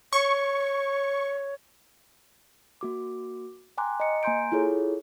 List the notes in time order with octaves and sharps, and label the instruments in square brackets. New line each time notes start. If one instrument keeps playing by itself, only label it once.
[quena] C#5 [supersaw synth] C#6
[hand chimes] A#3 F#4 D6
G5 G#5 A#5 C6 D6 F#6
D#5 A#5 C#7
A#3 G#5 A#5 C6 G6 D7
E4 F4 G#4 A4 C#5